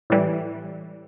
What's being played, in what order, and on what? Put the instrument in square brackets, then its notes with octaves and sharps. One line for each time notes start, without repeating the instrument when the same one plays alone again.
[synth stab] A2 E3 G3